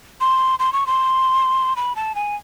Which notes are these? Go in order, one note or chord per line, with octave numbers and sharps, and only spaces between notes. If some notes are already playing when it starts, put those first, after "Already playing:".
C6
C6
C#6
C6
B5
A5
G#5